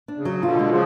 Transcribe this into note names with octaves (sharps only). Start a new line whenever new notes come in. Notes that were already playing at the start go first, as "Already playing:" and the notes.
D4
C#3
F#3
B2 D3 F4
G#3
C#3 F3